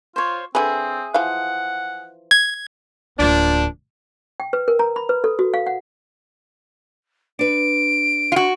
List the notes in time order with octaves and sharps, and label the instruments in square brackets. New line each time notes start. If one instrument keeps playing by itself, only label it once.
[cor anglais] F4 [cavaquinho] C5 C#5
[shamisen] D3 G3 B4 [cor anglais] C4 [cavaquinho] G#4 E5
[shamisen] E3 F3 F5 [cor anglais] F#5
[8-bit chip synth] G#6
[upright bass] D1 D2 [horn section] F3 A#3 D4
[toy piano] G5
B4
A#4
A#5
B5
B4
A4
F#4
F5
F#5
[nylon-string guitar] D4 B4 [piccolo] D7
[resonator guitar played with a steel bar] F4 F#4